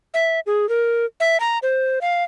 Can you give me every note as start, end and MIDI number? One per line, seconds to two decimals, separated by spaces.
0.14 0.40 76
0.46 0.68 68
0.69 1.05 70
1.20 1.40 76
1.40 1.58 82
1.63 1.99 72
2.01 2.24 77